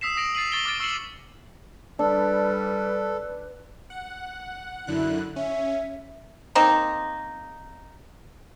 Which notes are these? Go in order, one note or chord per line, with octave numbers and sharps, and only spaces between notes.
D#6 E6 B6 C7 E7
D#6 A#6 D7 F7 F#7
A6 C7 D#7 F#7
C#6 D#6 A6 D7 F#7 G7
D6 F6 A6 D7
C#6 E6 C7 C#7 E7 F#7
G3 D4 A4 B4
F#5
F#2 D3 E4 F#6
C#4 E5
A#3 C4 D#4